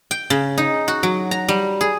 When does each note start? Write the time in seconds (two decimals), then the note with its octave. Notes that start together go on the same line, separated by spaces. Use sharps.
0.11 G5
0.30 C#3
0.58 D#4
0.88 F#4
1.03 F#3
1.31 A#5
1.48 G3
1.81 G#4